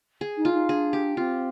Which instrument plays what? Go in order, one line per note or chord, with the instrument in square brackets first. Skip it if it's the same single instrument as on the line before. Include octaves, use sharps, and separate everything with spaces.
[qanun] G#4
[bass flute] D#4
[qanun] F4
[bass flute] D#4
[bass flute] D4 [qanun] G#4
[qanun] G4
[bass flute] C4 [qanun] F4